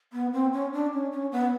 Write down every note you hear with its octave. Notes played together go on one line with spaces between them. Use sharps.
B3
C4
C#4
D4
C#4
C#4
B3